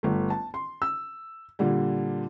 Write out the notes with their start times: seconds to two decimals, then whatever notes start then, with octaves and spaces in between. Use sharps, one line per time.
0.03 G1 A3
0.30 A5
0.54 C6
0.82 E6
1.59 A#2 D3 G3